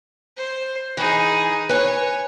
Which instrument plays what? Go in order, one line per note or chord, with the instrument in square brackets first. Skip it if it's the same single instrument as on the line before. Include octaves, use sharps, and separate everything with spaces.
[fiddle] C5
[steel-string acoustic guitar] E3 [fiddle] D#4 G#4
[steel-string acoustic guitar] B4 G#5 [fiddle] C#5